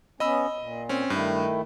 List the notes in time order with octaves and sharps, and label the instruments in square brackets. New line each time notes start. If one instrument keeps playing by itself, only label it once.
[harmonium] B3 C#4 [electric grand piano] D#5 B5 E6
[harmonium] A#2
[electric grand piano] C4 C#4
[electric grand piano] G2 [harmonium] D#3 A3 E4